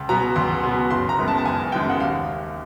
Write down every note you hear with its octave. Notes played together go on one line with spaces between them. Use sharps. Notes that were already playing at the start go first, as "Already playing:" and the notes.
Already playing: C#2
B2 F#3 B3 A#5
C#2 C6
B2 F#3 B3
F#1 C6
A#5
F#2 D#3 G#3 B3
A5
A5
F#1 G#5
F#2 D#3 G#3 B3 G5
F#5
D#2 F5